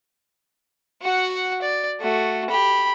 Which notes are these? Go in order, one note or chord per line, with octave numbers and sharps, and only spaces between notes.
F#4 F#5
D5
A3 F#4
G4 B5